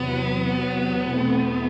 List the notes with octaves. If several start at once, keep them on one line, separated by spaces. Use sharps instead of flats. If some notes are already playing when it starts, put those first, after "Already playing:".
Already playing: E2 C3 F#3 B3
E2 B2 A3 C4